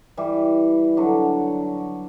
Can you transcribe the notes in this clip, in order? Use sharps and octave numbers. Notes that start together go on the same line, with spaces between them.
E3 G3
D3 F#3